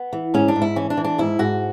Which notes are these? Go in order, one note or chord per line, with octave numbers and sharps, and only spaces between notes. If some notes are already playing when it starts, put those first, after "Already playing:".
Already playing: B3
E3
G#2 C#4
D4
G#2
E4
E3 C#4
D4
E3
D4
G#2 E4
G#2 F#4